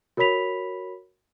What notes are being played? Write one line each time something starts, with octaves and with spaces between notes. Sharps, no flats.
F#4 A#4 C#5 B5 B6 F7